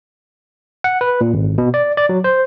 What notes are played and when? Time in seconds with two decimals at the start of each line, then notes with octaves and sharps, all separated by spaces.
0.84 F#5
1.01 B4
1.21 A#2
1.34 G#1
1.58 B2
1.74 D5
1.97 D5
2.09 F#3
2.24 C5